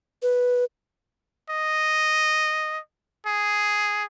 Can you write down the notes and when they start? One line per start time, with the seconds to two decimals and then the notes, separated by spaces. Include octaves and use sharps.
0.22 B4
1.50 D#5
3.26 G#4